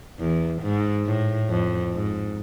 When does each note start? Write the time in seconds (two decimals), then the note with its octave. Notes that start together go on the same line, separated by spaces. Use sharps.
0.20 E2
0.62 G#2
1.06 A2
1.49 F2
1.93 G#2